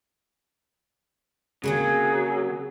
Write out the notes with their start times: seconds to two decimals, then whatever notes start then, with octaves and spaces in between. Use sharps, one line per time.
1.64 C#3 F#3 A#3 C4 G#4